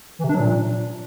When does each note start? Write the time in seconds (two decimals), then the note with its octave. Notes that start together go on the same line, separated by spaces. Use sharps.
0.19 E3
0.24 C3
0.29 D4
0.35 F#3
0.40 A#2